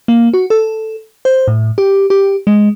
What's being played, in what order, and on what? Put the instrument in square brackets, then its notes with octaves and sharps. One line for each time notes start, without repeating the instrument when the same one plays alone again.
[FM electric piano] A#3
F#4
A4
C5
A2
G4
G4
G#3